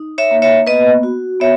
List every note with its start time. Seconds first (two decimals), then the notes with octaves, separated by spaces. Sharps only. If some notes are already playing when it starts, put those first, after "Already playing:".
Already playing: D#4
0.18 C#5 E5
0.31 A#3
0.42 C#5 E5
0.67 B3 B4 D#5
1.03 F#4
1.40 B3 C#5 E5